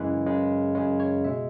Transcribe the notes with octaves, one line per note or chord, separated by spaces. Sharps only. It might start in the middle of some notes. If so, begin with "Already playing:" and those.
Already playing: F#2 C#3 E3 G#3 B4
F#2 C#3 G#3
F#2 C#3 G#3 C#5
C#5
B2 G#3 E5